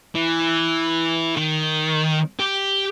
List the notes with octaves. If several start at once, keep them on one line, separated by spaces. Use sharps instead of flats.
E3
D#3
G4